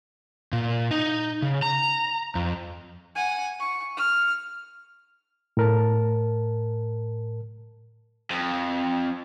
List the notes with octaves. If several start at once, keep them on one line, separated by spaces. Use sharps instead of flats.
A#2
D#4
C#3
A#5
F2
F#5 G#5
C#6
F6
A2 A#4 A5
F2